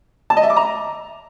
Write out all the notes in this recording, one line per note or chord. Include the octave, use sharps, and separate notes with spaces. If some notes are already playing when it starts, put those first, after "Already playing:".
A5
D#5
E5
D6
A#5